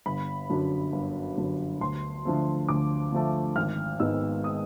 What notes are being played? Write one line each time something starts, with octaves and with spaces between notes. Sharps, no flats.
G1 B5
F#2 D3 F#3
G1
F#2 D3 F#3
D2 C6
D3 F3 A3
D2 D6
D3 F3 A3
G#1 F6
G#2 D#3 G#3 B3 E6
D#6